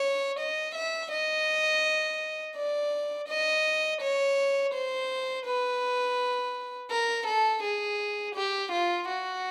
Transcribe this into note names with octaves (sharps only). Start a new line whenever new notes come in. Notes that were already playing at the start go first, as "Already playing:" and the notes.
Already playing: C#5
D#5
E5
D#5
D5
D#5
C#5
C5
B4
A#4
A4
G#4
G4
F4
F#4